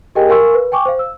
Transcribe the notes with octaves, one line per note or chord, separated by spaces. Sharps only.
G4 G#4 A#4 D#5 G5 G#5
A#4 F5 G#5 C6 C#6 E6
B4
G5 G#5 C#6 D6
C5 F5
E6